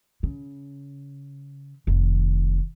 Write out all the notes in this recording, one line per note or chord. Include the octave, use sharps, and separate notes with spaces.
C#3
F1 D#3